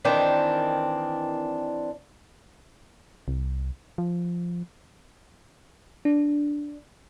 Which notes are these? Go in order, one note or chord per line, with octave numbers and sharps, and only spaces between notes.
D#3 E3 C4 D4
C2
F3
D4